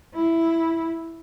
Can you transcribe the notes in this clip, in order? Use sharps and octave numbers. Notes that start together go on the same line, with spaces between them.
E4